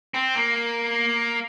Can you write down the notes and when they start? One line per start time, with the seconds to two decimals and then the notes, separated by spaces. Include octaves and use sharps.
0.14 C4
0.35 A#3